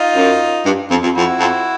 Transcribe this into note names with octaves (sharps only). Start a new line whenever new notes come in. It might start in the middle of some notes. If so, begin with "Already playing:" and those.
Already playing: D#4 F4
F#2
G2
F2
F2
F2 E4 F#4
F2